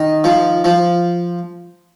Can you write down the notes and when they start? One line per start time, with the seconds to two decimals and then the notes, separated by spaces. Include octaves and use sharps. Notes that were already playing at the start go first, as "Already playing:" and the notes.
Already playing: D#3 D#4
0.24 F3
0.64 F3